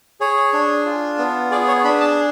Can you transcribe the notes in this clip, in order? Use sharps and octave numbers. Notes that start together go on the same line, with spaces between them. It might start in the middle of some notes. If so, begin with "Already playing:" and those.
G#4 C#5
D4
F4
B3
G#4 D5
C#5
D4 B5
A5